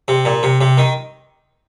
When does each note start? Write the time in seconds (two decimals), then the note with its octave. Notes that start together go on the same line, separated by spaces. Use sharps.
0.08 C3
0.25 A#2
0.43 C3
0.61 C3
0.78 D#3